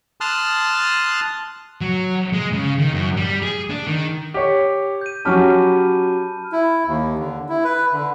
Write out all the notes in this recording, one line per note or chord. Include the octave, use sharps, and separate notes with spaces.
A5 C6 D#6 F6 F#6
F#3
G#3
C#3
D#3
F#2
G3
G#4
D4
D#3
G4 C#5
G6 D#7
F#3 C#4 G4 A5 B5 F6
E4
D#2
D3
E4
B4
D3